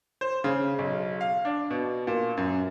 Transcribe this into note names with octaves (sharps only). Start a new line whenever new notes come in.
C5
C#3
B1
F5
D4
B2
A#2
F#2